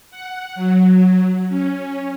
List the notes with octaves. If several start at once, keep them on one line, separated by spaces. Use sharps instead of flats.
F#5
F#3
C#4